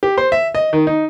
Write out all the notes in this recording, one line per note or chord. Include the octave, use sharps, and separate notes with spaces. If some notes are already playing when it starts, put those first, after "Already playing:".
G4
C5
E5
D#5
D#3
D#4